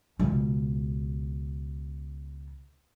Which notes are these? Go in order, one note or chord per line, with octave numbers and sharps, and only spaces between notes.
C#2 B2